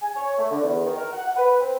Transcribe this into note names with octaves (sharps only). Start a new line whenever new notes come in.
G#5
C#5
A3
D3
E2
D#3
A#4
F#5
F#5
B4
C4